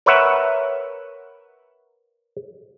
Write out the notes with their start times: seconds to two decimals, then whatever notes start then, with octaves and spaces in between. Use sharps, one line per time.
0.06 A#4 B4 C#5 E5 F#5